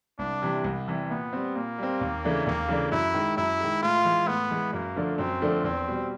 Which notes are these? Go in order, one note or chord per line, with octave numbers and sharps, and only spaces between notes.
C2 D4
C3 E3 G3
C2
C3 E3 G3
A#2 B3
G3 C4
A#2 A#3
G3 C4
D#2
C#3 E3 A3 D4
D#2 A#3
C#3 E3 A3 D4
F#2 E4
D#3 G#3
F#2 E4
D#3 G#3
A2 F4
E3 G#3
A2 B3
E3 G#3
F#2 A#3
D3 F3 A3 D4
F#2 C4
D3 F3 A3 D4
E2 C4
B2 G3